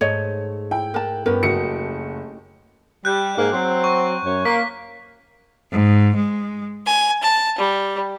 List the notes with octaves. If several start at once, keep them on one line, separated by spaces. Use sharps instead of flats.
G#2 A3 C#5 D#5
E4 G5
A#4 F#5 A5
G2 B3 C#4 G4 A#4
F#1 A3 F#4 D#5 C#7 D7
G3 F#6 G6
G#2 A#3
F#3 C4
C#6
F#2 C#5
A#3 B6
G#2
G#3
G#5
A5
G3